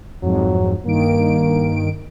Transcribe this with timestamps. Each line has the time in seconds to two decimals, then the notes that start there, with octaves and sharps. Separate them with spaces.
0.23 F2 G#2 F#3
0.86 G2 D#3 A#3 D7